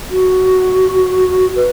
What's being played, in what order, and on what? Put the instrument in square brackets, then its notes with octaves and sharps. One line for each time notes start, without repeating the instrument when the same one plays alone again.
[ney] F#4
B4